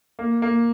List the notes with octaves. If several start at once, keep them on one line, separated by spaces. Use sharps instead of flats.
A#3
A#3